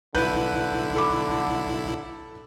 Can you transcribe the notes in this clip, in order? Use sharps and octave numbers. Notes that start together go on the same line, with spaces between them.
B1 D3 E4 B4 F#6 G6
A4 B5 D6